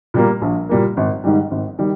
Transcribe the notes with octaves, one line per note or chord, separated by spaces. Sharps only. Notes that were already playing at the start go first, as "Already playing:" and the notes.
A#2 G3 A#3
A#1
A#2 G3 A#3
G#1
G#2 D#3 G3
G#1
D#3 G3